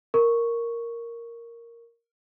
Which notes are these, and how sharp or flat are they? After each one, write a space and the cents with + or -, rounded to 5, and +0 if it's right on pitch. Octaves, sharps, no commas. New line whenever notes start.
A#4 +0 C#6 +0